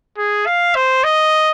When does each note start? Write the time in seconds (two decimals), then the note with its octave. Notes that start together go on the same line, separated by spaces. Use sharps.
0.18 G#4
0.46 F5
0.75 C5
1.04 D#5